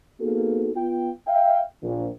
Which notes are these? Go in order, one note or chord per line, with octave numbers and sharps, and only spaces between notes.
A#3 B3 D#4 F#4 G#4 A4
B3 F4 G5
E5 F5 G5
A#1